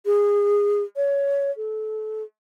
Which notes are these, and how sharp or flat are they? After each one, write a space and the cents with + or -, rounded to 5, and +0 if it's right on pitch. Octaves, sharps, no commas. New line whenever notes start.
G#4 -20
C#5 +15
A4 -25